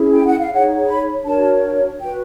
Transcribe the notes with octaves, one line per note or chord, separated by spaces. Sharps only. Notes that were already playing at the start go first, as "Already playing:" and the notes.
Already playing: C#4 E4 G#4
G5
F#5
F5
D#4 G#4 C#5 F#5
B5
D4 F#4 A#4 C#5 A5
F#4 B4 G5